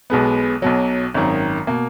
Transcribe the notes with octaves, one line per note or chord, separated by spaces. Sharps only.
B1 B2 G#3 B3
B1 B2 F#3
G#1 F#2 D#3
B2 A#3